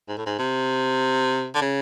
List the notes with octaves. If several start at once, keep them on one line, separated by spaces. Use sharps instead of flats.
G#2
A2
G#2
C3
D3
C#3